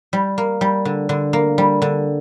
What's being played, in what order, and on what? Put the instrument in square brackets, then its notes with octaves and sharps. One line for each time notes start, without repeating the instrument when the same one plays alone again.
[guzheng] G3
A#3
G3
D3
D3
A#3
G3
D3